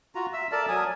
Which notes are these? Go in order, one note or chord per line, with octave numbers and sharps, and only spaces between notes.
F4 F#4 A#5
E5 E6
A4 A#4 D5 A5
F#3 G#5 D#6